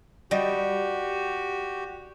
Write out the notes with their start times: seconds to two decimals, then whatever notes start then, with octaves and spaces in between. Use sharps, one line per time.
0.31 G3 F#4 G4 D#5